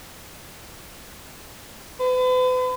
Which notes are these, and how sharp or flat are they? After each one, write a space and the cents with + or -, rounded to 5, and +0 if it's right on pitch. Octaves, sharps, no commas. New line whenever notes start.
B4 +40